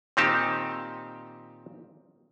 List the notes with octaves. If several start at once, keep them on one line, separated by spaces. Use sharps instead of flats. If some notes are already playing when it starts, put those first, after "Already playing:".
A#2 D#3 C4 D#4 G4 A5